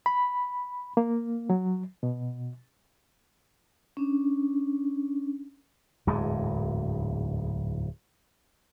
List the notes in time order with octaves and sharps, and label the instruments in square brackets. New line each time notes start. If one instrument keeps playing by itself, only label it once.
[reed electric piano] B5
A#3
F#3
B2
[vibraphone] C#4 D4
[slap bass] D1 E2 G#2 G#3